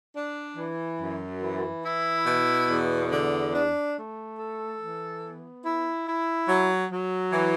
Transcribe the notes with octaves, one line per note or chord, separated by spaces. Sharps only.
D4
E3
F#2
E3
E4
B2
E2
D3
D4
A3
A4
E3
B3
E4
E4
F#3
F#3
E3